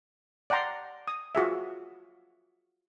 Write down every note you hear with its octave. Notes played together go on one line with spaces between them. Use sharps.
D5 F#5 G5 A#5 C6
D#6
F4 F#4 G#4 E5